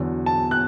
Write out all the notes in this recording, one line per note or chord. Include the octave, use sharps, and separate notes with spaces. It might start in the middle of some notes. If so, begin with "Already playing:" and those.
Already playing: E2 D3 F#3
A5
F#6